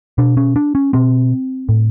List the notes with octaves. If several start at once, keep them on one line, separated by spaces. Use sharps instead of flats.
B2 D4
C#4
D4
C#4
B2 C4
A2